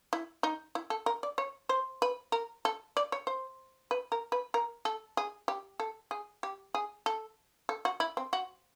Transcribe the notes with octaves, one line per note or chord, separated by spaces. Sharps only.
E4
D#4
E4
A4
A#4
D5
C#5
C5
B4
A#4
A4
D5
C#5
C5
B4
A#4
B4
A#4
A4
G#4
G4
A4
G#4
G4
G#4
A4
A4
F#4
E4
C4
F#4